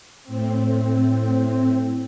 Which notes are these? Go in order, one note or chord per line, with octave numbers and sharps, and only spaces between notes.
A2 C4